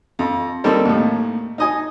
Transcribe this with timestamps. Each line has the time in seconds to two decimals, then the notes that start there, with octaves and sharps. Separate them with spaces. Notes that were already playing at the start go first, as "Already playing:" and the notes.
0.19 F2
0.64 G3 A#3 C4 D#4 A4
0.85 D#2 A2
1.58 D#4 D#5 G#5